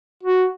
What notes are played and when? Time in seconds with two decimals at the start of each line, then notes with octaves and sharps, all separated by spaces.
0.23 F#4